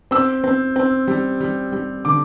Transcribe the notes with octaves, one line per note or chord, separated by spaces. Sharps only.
C4 E6
C4
C4
G3
G3
G3
D3 D6